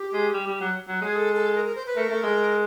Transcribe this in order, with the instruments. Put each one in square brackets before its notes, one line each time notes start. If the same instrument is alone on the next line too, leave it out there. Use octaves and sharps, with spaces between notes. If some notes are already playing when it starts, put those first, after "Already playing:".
Already playing: [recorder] G4
[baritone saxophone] G#3
G3
G3
F#3
F#3
[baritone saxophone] G#3 [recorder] G#4
[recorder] A4
A4
A#4
A#4
C5
B4
[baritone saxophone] A3 [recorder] A#4
[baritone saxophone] A3
G#3